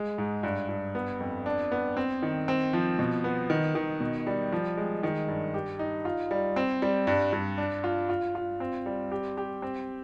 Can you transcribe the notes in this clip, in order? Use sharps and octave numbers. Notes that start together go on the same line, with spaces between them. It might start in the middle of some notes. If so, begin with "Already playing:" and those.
Already playing: G#3
G#2
G2
G2
B3
F2
D4
B3
C4
D#3
C4
F3
B2
B3
D#3
D#3
B2
G3
F3
G#3
D#3
G2
G4
D#4
F4
G3
C4
G3
G2
G2
D4
F4
F4
F4
C4
G3
G4
G4
C4